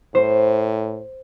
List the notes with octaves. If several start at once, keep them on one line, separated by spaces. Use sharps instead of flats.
A2 C5